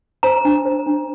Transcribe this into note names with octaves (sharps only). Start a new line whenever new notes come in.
C5 A#5
D4
C5
D4